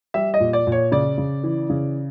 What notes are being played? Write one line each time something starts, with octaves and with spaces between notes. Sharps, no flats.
G3 E5
D#5
A#2
D5
A#2
C#5
C#3 D5
C#3
E3
C#3